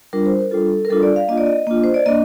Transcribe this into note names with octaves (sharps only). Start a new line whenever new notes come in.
G3 D4 F4 A#4
C5
A#4
G3 D4 F4 A4
A#4
G3 D4 F4 A4
D5
F5
A#3 D4 F4 D#5
D5
D#5
A#3 D4 F4
C5
D5
A#3 D4 D#5